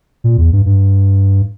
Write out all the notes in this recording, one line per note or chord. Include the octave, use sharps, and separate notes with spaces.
A#2
E2
G2
G2